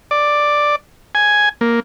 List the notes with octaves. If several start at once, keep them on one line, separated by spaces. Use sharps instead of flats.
D5
G#5
A#3